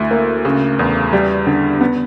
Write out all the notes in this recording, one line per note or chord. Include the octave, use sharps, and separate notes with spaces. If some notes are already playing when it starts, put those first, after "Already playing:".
Already playing: D2 E4
A#3
C#3
E2
G3
D3
B3